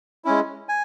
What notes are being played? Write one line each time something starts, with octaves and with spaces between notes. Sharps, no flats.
G#3 C#4 E4
G#5